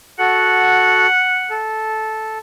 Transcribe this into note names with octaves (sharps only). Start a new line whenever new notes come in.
F#4 A4 F#5
A4